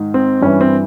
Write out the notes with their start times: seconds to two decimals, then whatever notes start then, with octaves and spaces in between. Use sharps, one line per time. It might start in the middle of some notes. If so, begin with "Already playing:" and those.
Already playing: G#2 D#3
0.14 C4
0.42 G2 E3 C#4
0.61 C4